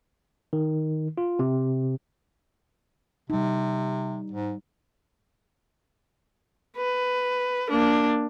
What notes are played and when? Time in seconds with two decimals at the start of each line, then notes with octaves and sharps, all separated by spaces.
0.53 D#3
1.18 F4
1.39 C3
3.30 C3 G3 D#4
4.32 G#2
6.77 B4
7.69 A#3 D4